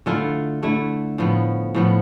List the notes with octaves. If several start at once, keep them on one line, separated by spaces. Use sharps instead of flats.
D3 A3 E4 F4 A4
D3 A3 E4
A2 F3 B3
A2 F3 B3